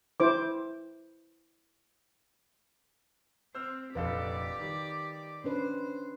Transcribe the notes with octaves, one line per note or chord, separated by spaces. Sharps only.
E4 C5 D6
C4 C5 E6 F6
F1 A#1 G4 A4 B4 D5 F5
D#3 G3
C#4 D4 B4 C5